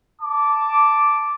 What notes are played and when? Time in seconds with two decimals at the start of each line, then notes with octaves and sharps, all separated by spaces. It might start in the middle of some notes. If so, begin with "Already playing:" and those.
0.21 A5 D6